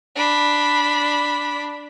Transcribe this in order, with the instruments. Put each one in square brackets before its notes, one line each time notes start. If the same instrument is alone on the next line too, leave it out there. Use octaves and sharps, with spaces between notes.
[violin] D4 B5